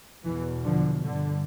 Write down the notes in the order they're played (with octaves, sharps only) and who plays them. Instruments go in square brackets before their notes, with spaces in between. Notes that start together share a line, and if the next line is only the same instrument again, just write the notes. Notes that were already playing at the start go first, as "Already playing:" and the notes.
[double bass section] E2 B2 E3
D3 F3
G2 D3